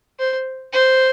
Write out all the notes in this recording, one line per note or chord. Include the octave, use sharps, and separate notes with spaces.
C5
C5